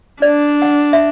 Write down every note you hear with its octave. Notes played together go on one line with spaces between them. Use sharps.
D4 D5
F#5
E5